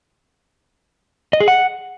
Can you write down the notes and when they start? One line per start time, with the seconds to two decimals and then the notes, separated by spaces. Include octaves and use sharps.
1.33 D#5
1.40 G#4
1.48 F#5